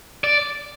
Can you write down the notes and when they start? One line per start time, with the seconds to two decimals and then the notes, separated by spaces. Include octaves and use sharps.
0.24 D5